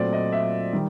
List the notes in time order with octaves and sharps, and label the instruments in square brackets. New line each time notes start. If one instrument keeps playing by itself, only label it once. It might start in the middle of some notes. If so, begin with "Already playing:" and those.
Already playing: [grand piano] A#2 F#3 A3 C4 D5
D#5
E5
D#3 G3